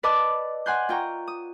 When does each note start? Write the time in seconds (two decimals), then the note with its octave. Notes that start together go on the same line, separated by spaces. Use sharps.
0.03 B4 D5 D#5 A5 D6 E6
0.66 F#5 G#5 C6 F#6 G6
0.89 F4 G5 A#5 C#6
1.28 D#6